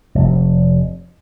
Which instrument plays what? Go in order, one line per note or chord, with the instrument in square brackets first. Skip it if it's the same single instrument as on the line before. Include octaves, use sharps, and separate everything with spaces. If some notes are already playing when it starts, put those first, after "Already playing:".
[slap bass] F1